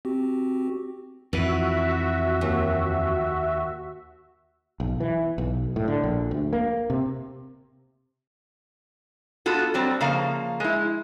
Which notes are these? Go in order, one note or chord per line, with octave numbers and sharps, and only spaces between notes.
C4 F#4 G4
F2 E3 F#4 B4 E5
D#2
B1
E3
B1
A2
D3
A#1
D2
A#3
C3
B3 F4 F#4 A4
F#3 G3 C4
C#3 F3 A#3 F5
G#3 E4